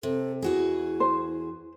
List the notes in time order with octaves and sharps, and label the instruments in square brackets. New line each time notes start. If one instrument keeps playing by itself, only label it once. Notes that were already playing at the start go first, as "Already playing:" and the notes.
[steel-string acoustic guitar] C3 [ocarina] A4
[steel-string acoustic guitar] E2 F#4 G#4 [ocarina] E4
[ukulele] C5